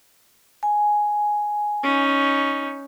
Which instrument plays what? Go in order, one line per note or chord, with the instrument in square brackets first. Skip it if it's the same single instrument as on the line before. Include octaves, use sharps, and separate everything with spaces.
[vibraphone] G#5
[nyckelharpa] C#4 D#4